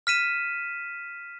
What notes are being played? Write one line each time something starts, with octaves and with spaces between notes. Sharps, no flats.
F6 B6 D#7 E7